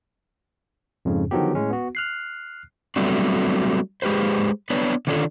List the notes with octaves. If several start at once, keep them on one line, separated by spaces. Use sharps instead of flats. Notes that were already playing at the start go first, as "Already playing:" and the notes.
F2 G#2 C#3
D3 D#3 F3 F#3 B3 G4
A2 G#3 C#4
B3 F#4
F6 F#6 C7
F#3 G3 A3 B3 C4 D4
G#3 G4 B4 C5
B3 D4 B4 C#5
D3 D#3 C#4 D4 F4 A4